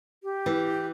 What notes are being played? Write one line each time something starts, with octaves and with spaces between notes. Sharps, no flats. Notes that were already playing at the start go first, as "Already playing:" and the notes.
G4
E3